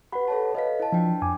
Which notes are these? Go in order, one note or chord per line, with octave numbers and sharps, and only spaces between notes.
G4 B4 F#5 B5
A4 C#5 A5
A4 B4 D#5 F5 B6
E4 A5
F3 D4 C5 G5
F2 G#5 D6